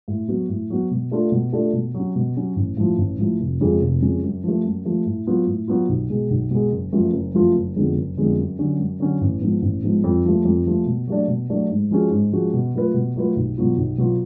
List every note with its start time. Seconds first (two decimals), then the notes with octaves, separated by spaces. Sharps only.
0.08 A2
0.28 F#3 B3 F#4
0.49 A2
0.70 F#3 B3 F#4
0.91 B2
1.11 A3 D4 F4 A4
1.32 B2
1.53 A3 D4 F4 A4
1.73 B2
1.94 F#3 C#4
2.15 B2
2.36 F#3 C#4
2.56 A1
2.77 A2 F3
2.98 A1
3.18 A2 F3
3.40 F1
3.61 F2 C#3 G#3 C#4
3.82 F1
4.02 F2 C#3 G#3 C#4
4.23 F#2
4.44 F3 A3
4.65 F#2
4.85 F3 A3
5.06 A2
5.27 F#3 B3 F4
5.47 A2
5.68 F#3 B3 F4
5.89 B1
6.10 B2 G#3
6.30 B1
6.51 B2 G#3
6.72 F#1
6.92 F#2 F3 A3 F4
7.13 F#1
7.34 F#2 F3 A3 F4
7.56 F#1
7.76 F2 D3 G#3 B3
7.96 F#1
8.17 F2 D3 G#3 B3
8.38 F#2
8.58 D3 F#3 C#4
8.79 F#2
9.00 D3 F#3 C#4
9.21 A1
9.41 G#2 F3 B3
9.62 A1
9.83 G#2 F3 B3
10.04 F2
10.25 F3 A3
10.45 F2
10.66 F3 A3
10.86 B2
11.07 F#3 A3 D4
11.28 B2
11.50 F#3 A3 D4
11.70 G#2
11.91 F3 G#3 C#4 F#4
12.11 G#2
12.33 F3 G#3 C#4 F#4
12.53 B2
12.74 F#3 A3 F4 B4
12.94 B2
13.16 F#3 A3 F4 B4
13.36 B1
13.57 B2 F#3 B3 F4
13.78 B1
13.98 B2 F#3 B3 F4